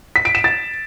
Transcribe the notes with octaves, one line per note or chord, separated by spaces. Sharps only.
B6
D7
E7
A6